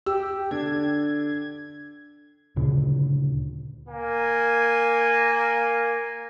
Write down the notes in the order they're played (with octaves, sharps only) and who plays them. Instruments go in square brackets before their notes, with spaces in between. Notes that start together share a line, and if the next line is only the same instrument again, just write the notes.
[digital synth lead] G4 [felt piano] E6
[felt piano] D3 D4 [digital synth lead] G#6
[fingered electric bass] D2 A#2 C#3
[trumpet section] A#3 G#5